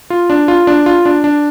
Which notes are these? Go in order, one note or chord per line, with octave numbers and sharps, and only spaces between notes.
F4
D4
F4
D4
F4
D4
D4